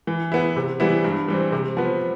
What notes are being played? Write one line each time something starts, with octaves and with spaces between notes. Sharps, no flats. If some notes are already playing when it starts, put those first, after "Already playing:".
E3
B3 E4
C3
E3 G3 B3 E4
G2
E3 G3 C4
C3
F3 B3